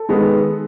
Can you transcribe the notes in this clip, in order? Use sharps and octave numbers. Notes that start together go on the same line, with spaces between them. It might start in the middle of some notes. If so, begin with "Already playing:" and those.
Already playing: A4
D#3 G#3 B3